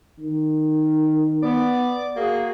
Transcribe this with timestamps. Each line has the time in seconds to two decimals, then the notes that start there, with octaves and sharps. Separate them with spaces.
0.19 D#3
1.43 B3 D5
2.17 A#3 F#4 G#4